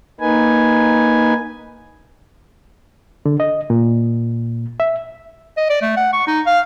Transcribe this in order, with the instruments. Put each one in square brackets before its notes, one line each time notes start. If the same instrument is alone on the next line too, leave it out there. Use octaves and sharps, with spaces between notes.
[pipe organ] A#3 D#4 B4 G#5
[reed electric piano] D3
D#5
A#2
E5
[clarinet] D#5
D5
A3
F#5
C#6
D#4
F5